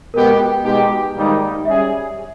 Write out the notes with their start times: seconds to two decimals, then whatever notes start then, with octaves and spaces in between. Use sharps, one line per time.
0.13 B2 G#3 B3 G4 A#4
0.39 G5
0.64 B2 G#3 D#4 G4 G5
1.15 G#2 D#3 G3 A#3 D#4
1.65 G3 C#4 G#4 E5